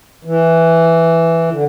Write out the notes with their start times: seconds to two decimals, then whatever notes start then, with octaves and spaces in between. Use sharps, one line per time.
0.25 E3
1.51 D3